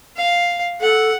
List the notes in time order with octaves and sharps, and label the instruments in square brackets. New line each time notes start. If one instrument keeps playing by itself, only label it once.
[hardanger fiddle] F5
[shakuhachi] A4 [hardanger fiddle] F#5